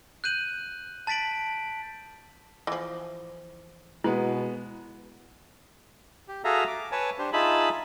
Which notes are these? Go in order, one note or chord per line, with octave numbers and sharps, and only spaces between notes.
F#6 G6 D#7 F#7
A5 A6 B6 D7 F#7
E3 F3
B2 G#3 B3 E4
G4
F#4 G#4 A4 E5 F5 A#5
D6
B4 C#5 G#5 A5
D4 G4 C5
D#4 F4 G#4 E5 A5 B5